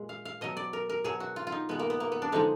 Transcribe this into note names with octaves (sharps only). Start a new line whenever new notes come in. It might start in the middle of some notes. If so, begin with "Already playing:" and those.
Already playing: A#2 G#3
F5
F5
B2 F#3 D#5
D5
A#4
A#4
B2 F#3 G#4
F#4
F4
F4
D#4
B2 G#3 B3
A#3
B3
A#3
B3
D4
D3 F3 G#3 D#4